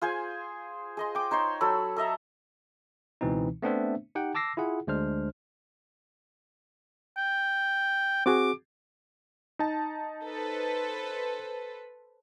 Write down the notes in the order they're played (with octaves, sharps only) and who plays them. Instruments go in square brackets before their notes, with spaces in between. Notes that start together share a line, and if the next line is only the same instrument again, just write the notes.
[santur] F4 G#4 C5 G#5
G#4 D#5 C6
G5 D6
D#4 C5 C#5 C6
F#3 A4 B5 E6
A4 D#5 E5 A#5
[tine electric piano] C#2 B2 E3 C4 D#4
A3 B3 C4 D4 C5 E5
D#4 G4 F#5 G5
A5 D6 E6 A#6 C7
E4 F4 G#4 F#5
D2 G#3 D4 C5 F6
[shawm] G5
[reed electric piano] C4 F#4 G#4 [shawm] D6
[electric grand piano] D#4 A5
[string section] A4 B4 C5